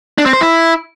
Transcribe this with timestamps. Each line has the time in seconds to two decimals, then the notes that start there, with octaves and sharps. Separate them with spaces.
0.18 D4
0.26 C4
0.33 C5
0.41 E4